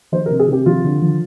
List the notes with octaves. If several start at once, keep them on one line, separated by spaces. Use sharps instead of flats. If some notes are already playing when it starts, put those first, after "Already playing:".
F3 C5
A#4
C3
G#4
C3 G4
F3 F4
D3
F3